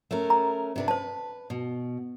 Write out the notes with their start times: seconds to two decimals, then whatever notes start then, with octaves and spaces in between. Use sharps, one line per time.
0.11 A3 C#4 A#4
0.30 A#5
0.76 C3 D4 B4
0.88 B4 C5 A5
1.50 B2